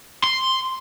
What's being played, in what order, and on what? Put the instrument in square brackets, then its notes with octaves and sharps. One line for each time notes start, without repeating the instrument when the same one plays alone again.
[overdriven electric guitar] C6